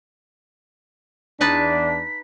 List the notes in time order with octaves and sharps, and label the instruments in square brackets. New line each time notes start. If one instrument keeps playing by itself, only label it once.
[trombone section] E2 D4 [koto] D#4 B4 A5 [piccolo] B6